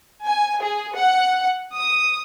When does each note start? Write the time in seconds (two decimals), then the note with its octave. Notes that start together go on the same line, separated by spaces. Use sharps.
0.24 G#5
0.62 G#4
0.95 F#5
1.72 D#6